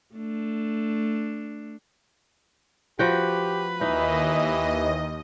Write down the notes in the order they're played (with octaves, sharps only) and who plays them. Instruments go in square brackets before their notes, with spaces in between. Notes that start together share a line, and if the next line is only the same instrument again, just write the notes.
[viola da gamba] A3 D4
[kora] F3 F#4 G5 [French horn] G4 [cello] B4
[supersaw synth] D#2 D#5 [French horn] E3 [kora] D#4